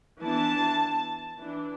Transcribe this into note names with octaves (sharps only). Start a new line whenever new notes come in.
E3 B3 D4 A5
E3 D4